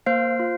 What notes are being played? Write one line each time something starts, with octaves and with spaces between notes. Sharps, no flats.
A#3 C5 F5
F4